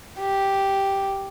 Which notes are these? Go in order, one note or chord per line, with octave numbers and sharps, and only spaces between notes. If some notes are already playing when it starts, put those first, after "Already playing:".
G4